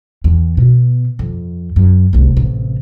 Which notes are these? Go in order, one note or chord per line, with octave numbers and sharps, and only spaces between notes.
E2
B2
F2
F#2
F1 C2
A1 C3